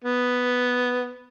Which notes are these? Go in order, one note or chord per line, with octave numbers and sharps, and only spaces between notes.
B3